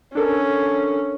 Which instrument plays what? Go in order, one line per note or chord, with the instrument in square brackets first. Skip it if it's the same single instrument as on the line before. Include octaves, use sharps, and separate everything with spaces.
[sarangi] C#4 [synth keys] D4 A4 A#4